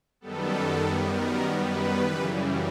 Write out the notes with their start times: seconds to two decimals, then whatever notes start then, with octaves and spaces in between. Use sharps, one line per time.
0.21 F#2 D#3 G3 B3 A4
1.13 A#4
1.58 B4
2.04 F#2 C#3 E3 G3